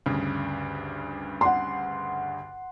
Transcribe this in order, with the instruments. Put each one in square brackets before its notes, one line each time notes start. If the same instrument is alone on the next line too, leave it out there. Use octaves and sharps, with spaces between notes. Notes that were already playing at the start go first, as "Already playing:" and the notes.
[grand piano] D2 G2 C#3
[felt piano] F#5 C6